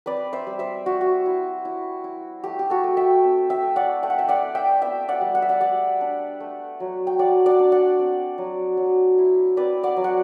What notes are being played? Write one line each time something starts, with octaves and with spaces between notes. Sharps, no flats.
C4 B4 D5
C5 E5
G3
C5 E5
G3 F#4
F#4
E4
E4
E4
A3 G4
G4
F#4 A4
A3
E5 G5
C4
E5 G5
A3
D5 F#5
A3 G5
F#5
E5 G5
D5 F#5
E4
E5 G5
B3 E5 G5
D5 F#5
G3
F#5
E5
D5 F#5
G3 D5 F#5
D4
A3
F#3
G5
F#3 D5 F#5
D5 F#5
D4
D5 F#5
C4
F#3
F#3
E4
C4 B4 D5
D5 F#5
F#3
F#5